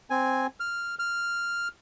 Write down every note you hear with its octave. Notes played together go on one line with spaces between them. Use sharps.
C4 G#5
F6
F6